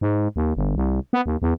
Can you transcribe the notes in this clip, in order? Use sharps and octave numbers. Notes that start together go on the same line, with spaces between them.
G#2
D#2
G1
C2
B3
D#2
E2